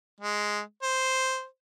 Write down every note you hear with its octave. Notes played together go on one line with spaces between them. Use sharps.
G#3
C5